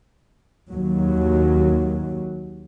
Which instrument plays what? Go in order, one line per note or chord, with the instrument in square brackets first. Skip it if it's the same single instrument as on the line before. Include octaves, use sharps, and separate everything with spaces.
[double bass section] D#2 F#3